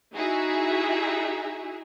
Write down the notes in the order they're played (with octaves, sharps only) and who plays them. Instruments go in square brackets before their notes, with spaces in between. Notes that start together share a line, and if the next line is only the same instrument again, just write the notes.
[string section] D#4 E4 F#4 G#4 E5